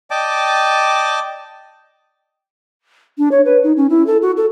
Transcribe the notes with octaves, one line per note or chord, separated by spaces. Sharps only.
D5 D#5 G5 A5 D6
D4
C#5
B4
D#4
C#4
E4
A4
F#4
A4